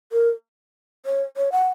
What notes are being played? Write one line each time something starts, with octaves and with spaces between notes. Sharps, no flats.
A#4
C#5
C#5
F#5